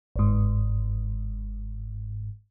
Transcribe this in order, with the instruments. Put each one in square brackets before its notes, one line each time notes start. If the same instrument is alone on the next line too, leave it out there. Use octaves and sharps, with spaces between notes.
[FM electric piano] G1 G#2